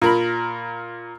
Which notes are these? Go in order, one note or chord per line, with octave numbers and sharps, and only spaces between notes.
A#2 A#4 B5